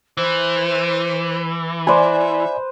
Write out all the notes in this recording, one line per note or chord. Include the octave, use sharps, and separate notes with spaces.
E3 C5
B4 C5 D5 E5 G#5